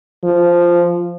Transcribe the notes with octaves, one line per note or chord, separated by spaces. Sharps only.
F3